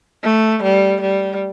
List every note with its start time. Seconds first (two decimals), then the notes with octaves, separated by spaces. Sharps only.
0.23 A3
0.63 G3
1.01 G3